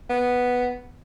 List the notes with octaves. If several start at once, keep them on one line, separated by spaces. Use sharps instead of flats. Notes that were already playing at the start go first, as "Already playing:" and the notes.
B3